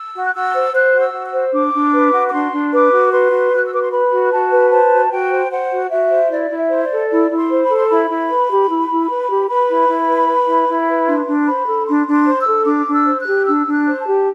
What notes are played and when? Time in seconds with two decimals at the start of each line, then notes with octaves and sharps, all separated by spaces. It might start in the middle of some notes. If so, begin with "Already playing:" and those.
Already playing: E6
0.14 F#4
0.25 F#6
0.33 F#4 E6
0.54 C5
0.73 C5 F#6
0.93 F#4
0.99 E6
1.13 F#4
1.26 E6
1.33 C5
1.52 D4 D6
1.72 D4
1.92 B4
2.12 F#4
2.27 D6
2.32 D4 C6
2.52 D4
2.72 B4 D6
2.92 F#4
3.12 B4 C6
3.32 F#4
3.52 F#4 F#6
3.65 E6
3.72 B4 D6
3.82 C6
3.91 B4 B5
4.11 F#4
4.31 F#4 A5
4.51 B4
4.71 C5 A5
4.91 F#4
5.11 F#4 G5
5.31 C5
5.51 C5 F#5
5.70 F#4
5.90 F#4 E5
6.10 C5
6.30 E4 D5
6.50 E4
6.57 E5
6.70 C5
6.83 D5
6.90 A4
7.09 E4 D5
7.30 E4
7.36 C6
7.49 C5
7.63 B5
7.69 A4
7.75 C6
7.89 E4 B5
8.09 E4
8.29 B4
8.49 G4
8.69 E4
8.89 E4
9.08 B4
9.29 G4
9.48 B4 B5
9.68 E4
9.87 E4
10.08 B4
10.28 B4
10.47 E4
10.68 E4
10.88 B4
11.07 D4 C6
11.27 D4
11.47 C5 B5
11.67 A4
11.87 D4 C6
12.07 D4
12.13 C6
12.27 C5
12.40 E6
12.47 A4
12.66 D4 D6
12.86 D4
12.93 E6
13.06 C5
13.20 F#6
13.26 G4
13.46 D4 E6
13.66 D4
13.73 F#6
13.86 C5
13.99 A5
14.06 G4